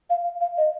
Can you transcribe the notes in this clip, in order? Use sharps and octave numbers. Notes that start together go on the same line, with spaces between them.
F5
F5
D#5